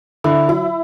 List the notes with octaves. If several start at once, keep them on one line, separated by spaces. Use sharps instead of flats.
D3 E4
F#3 E4